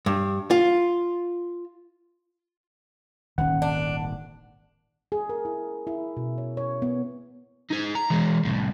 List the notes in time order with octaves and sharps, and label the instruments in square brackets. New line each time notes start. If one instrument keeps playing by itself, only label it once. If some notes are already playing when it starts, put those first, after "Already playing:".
[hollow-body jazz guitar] G2
F4
[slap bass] D#1 G#1 [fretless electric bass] D#3 C#4 [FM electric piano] F#5
[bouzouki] D4
[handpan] G#4
A#4
E4
E4
B2
C#5
C#5
B3
[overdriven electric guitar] D#4 G#4
A#5
E3 G#3
C2 A2